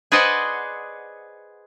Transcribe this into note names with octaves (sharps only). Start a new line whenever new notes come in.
G#4 B4 C5 D5 D#5 F#5